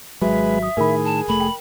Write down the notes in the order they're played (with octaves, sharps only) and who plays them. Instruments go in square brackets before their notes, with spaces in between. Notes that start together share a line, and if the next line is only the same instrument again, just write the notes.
[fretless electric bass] G#1 F#3 [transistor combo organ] G#3 B4 [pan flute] E5
[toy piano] D#6
[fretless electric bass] A2 D#3 [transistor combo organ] G#4 [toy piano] A#4 B5
[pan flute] A5
[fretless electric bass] F1 A3 [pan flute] B5
[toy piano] G5